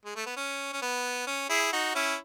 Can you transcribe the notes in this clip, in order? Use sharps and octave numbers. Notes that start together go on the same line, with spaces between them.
G#3
A3
B3
C#4
C#4
B3
C#4
E4 G#4
D#4 F#4
C#4 E4